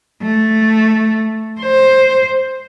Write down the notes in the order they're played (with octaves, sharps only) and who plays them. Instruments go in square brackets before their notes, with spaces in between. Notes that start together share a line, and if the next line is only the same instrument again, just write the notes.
[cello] A3
C5